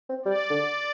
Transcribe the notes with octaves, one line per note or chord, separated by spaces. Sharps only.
C4
G3 D5
D3